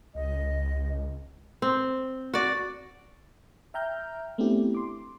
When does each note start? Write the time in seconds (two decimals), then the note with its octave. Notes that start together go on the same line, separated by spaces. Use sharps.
0.15 C#2 D#5
1.62 C4
2.34 F#4 D5
3.74 E5 G5 A#5 F6 G6
4.38 A3 B3 C4 D4 E4 G4
4.75 C6 D6